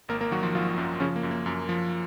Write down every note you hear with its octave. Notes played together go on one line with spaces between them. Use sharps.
G#1 A#3 A#4
A#3 A#4
D#3 F#3 F#4
F3 F4
G#1 F3 F4
F#2
C#3 F3 C#4
A#3
F#2
A#3
F#2 A#3
F3